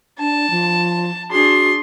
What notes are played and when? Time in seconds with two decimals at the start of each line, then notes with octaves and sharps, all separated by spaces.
0.19 D4 A5
0.51 F3
1.31 D4 F#4 G#4 C6